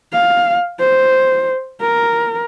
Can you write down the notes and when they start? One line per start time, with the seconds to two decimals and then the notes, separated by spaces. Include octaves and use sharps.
0.12 F5
0.79 C5
1.81 A#4